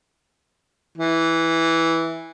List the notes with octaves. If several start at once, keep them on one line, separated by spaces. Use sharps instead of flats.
E3